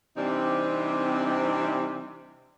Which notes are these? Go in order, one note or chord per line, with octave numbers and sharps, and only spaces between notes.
C3 E3 G3 C4 D4 D#4